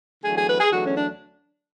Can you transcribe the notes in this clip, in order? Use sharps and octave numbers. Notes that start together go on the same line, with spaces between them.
E2 D3 F#3 A3 G#4
G#4
B4
G#4
E2 D3 F#3 A3 F#4
C#4
D4